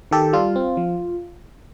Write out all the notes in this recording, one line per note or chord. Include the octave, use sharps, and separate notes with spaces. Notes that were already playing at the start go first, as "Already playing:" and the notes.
D#3 G4 A4
G3 F4
C4
F3